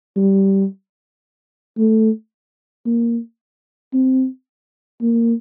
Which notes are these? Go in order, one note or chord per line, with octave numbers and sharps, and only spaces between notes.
G3
A3
A#3
C4
A#3